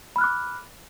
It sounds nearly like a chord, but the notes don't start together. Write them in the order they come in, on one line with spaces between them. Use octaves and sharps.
B5 F6 F#6 D6